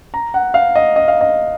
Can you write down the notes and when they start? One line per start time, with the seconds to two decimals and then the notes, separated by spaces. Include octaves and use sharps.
0.14 A#5
0.34 F#5
0.54 F5
0.75 D#5
0.96 D#5
1.08 F5
1.21 D#5